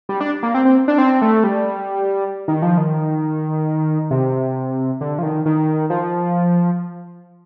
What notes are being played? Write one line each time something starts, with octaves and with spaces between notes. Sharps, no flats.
G3
D4
A#3
C4
C4
D4
C4
A3
G3
D#3
F3
D#3
C3
D3
F3
D#3
D#3
F3